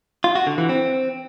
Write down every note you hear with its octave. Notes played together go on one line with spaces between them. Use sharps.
F4
F#4
D3
E3
C4